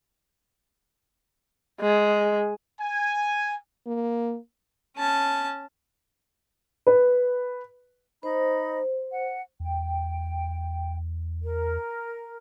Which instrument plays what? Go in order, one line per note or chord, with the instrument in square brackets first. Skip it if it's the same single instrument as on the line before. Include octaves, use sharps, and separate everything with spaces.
[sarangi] G#3
[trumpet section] G#5
[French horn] A#3
[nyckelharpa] C#4 A5
[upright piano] B4
[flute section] D#4 D#5 B5 [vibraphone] C5
[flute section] F#5
[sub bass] E2 [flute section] G5
[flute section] A#4